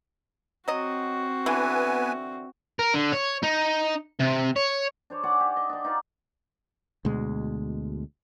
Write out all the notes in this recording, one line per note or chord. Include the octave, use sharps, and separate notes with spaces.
F#3 C4 F#4 D#5
D3 E3 B3 B4 G#5
A#4
D3
C#5
D#4
C3
C#5
D4 C5 C#5
D5 F#5 G#5 D6
G4
D#5
D4 D5
D#4 F4 D5
D2 B2 G#3